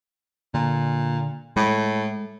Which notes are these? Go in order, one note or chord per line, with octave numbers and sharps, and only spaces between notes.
A#2 D3
A2 G#3